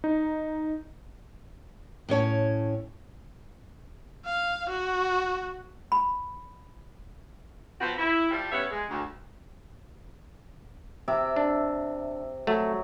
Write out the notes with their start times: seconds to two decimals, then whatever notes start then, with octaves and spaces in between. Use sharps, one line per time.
0.04 D#4
2.09 A2 C#4 C#5 A5
4.25 F5
4.69 F#4
5.92 B5
7.81 F3 B3 C4 F#4 B4 C5
7.98 E4
8.31 F3 G3
8.52 G3 B3 C#4 C#5 E5 F#5
8.71 G#3
8.90 D2
11.08 C3 E5 D6
11.36 D4
12.47 F#3 A3